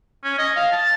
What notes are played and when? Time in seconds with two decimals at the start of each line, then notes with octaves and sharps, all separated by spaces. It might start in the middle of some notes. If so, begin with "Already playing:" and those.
0.24 C#4
0.39 D#5
0.56 F5
0.72 A5